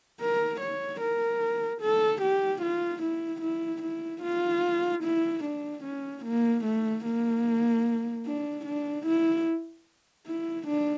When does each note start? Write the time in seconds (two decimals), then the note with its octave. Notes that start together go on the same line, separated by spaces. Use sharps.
0.20 A#4
0.60 C#5
1.00 A#4
1.81 A4
2.21 G4
2.62 F4
3.03 E4
3.42 E4
3.82 E4
4.23 F4
5.04 E4
5.44 D4
5.84 C#4
6.25 A#3
6.65 A3
7.05 A#3
8.26 D4
8.66 D4
9.06 E4
10.27 E4
10.67 D4